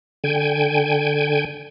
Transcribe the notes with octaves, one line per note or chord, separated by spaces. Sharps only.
D3 G5 G#5